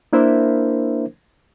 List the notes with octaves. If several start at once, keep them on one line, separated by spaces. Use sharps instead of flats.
A#3 D4 E4 A#4 C5 E5